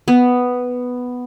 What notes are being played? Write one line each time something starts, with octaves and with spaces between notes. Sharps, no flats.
B3